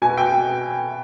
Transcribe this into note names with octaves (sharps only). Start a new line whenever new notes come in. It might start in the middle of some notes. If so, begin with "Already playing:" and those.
B2 G#5
G5